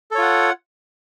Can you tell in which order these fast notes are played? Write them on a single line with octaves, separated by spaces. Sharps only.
A4 C#5 F4 F#5